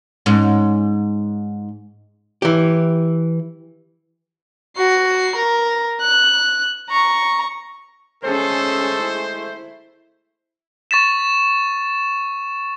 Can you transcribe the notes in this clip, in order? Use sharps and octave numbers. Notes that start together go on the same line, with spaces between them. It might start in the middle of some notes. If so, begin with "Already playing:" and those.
G#2 C#4
E3 G4
F#4 C7
A#4
F#6
A#5 C#6
G#3 A3 C#4 G#4 A4 C5
E4
C#6 A6 B6 E7